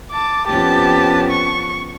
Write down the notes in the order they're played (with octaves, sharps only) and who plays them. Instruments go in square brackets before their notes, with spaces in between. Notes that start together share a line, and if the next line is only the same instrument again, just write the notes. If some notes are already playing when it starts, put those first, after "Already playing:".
[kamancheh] A5 D6
[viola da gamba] F2 B3 C#4 [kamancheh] G4 A5
[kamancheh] C#6